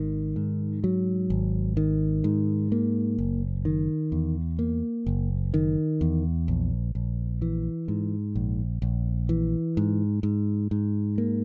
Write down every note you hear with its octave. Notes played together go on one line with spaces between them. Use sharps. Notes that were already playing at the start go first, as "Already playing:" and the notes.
Already playing: G#1 D#3
G#2
F#3
G#1
D#3
G#2
A#3
F#1
D#3
E2
A#3
F#1
D#3
E2
A#1
A#1
E3
G#2
A#1
A#1
E3
G#2
G#2
G#2
A#3